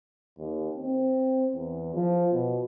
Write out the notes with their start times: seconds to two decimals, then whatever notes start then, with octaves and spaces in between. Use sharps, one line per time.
0.38 D#2
0.76 C4
1.55 E2
1.95 F3
2.33 B2